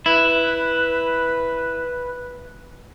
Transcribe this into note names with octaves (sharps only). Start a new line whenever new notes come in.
E4 B4